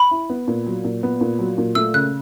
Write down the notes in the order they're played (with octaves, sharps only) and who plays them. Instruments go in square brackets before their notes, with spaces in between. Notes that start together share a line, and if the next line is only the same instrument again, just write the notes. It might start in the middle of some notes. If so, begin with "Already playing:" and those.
Already playing: [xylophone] B5
[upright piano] E4
B3
A#2
F#3
A#2
B3
A#2
F#3
A#2
[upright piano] A3 [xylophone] E6
[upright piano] C#3 [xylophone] F#6